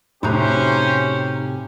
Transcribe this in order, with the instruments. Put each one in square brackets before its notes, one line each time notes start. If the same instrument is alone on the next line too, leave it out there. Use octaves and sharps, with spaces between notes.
[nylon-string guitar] A2 C3 [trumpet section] C#4 G4 C5 [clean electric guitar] D#4 F#4 A#5